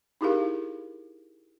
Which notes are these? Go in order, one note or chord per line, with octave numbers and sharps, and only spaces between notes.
D#4 E4 G4 G#4 A#4 F5